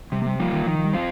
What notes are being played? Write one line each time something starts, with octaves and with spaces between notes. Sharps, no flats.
C3 G3
A#3
G3
F3 G3 A#3 F4
D#3
D#3 F3
F3
G3
C4 F4